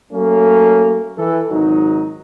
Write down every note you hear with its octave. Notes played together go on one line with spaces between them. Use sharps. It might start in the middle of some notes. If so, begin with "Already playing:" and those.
F#3 A3 A#3 C#4 A4
E3 A4
G#1 C#2 F#3 D#4